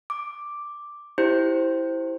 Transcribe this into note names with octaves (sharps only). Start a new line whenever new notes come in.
D6
E4 G4 C5 G6